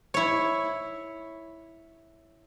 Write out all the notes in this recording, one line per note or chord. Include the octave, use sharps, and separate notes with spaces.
E4 C#5